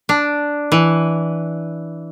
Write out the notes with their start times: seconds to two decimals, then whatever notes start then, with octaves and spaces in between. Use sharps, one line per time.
0.09 D4
0.72 E3